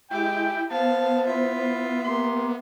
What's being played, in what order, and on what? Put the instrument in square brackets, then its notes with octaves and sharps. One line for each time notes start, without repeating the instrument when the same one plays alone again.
[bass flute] G#3 [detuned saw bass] E4 [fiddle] G4 [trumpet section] G5
[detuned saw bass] B3 [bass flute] C5 [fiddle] F5 [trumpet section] A5
[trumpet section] E4 F4 [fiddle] E5
[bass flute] A#3 [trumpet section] G4 C6